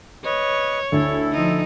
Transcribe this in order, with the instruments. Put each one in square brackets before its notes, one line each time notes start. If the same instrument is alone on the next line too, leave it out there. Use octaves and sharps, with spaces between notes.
[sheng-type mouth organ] B4 D#5 [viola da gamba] C#5
[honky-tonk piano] D2 [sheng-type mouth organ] E4 A4
[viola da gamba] F3 D#4